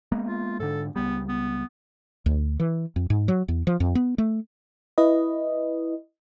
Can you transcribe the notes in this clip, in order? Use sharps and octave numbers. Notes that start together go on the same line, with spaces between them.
G#3 A#3 B3
F4
G#2 D3 A4
C#2 G3 B3
B3
D2
E3
F2
G#2
F#3
E2
F3
F2
B3
A3
E4 B4 D#5